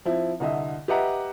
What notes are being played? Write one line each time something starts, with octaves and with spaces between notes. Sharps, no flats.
F3 C4 E4
C2 D3 D#5 E5
G4 B4 D#5 E5 F#5 A#5